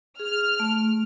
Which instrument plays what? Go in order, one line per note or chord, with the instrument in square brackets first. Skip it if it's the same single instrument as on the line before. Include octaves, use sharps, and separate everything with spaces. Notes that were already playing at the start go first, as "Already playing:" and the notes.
[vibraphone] G#4 [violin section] F6
[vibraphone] A3